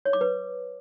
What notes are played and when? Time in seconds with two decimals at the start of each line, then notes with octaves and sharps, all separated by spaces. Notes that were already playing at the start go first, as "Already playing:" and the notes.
0.05 C#5
0.13 D6
0.21 B4